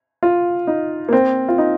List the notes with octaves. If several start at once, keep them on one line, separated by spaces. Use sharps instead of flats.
F4
D#4
A#3
C4
F4
D#4